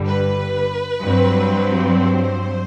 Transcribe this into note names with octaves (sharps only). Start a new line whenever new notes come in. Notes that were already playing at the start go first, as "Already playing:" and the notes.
Already playing: G1 G2 D3 G3
B4
G2 F#3 C4
C5